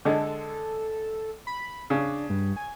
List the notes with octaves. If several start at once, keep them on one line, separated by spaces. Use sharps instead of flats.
D3 G#3 A4
B5
C#3 D4
G2
G#5